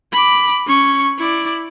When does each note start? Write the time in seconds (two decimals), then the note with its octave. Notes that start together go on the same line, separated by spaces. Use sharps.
0.12 B5 D6
0.67 C#4 C#6
1.19 E4 D5